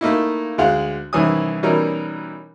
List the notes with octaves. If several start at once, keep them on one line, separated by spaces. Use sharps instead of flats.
A3 A#3 D#4 E4
D2 G#3 F5 F#5
C2 D#3 E3 C#4 G#5 D#6
B2 E3 G3 C#4 D#4 A#4